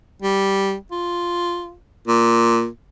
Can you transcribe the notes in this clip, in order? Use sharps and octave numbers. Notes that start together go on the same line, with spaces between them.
G3
F4
A#2